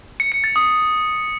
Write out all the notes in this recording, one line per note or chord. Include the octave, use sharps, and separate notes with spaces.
C#7
C#7
A6
D#6